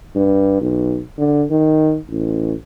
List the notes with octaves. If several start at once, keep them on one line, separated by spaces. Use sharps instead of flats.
G2
B1
D3
D#3
A1